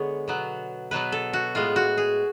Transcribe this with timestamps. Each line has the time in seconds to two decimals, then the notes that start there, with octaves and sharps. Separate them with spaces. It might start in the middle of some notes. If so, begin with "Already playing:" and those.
Already playing: D3 G#3 B3 C#5
0.28 B2 F#3 B3
0.91 B2 F#3 B3 B4
1.12 A4
1.33 F#4
1.55 A2 G#3 B3 F4
1.76 F#4
1.97 G#4